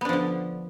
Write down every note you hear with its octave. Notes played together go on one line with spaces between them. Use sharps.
D3 F3 B3 D4